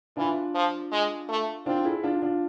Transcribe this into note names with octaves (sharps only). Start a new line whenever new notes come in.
E3 D4 F4
F3
G#3
A3
C4 D4 F4
E4 G#4
D4 F4
D4 F4